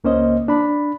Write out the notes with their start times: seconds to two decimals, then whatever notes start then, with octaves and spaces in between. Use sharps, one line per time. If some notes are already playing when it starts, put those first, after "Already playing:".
0.04 C#2 A#3 C#4 C5 D#5
0.48 D4 B5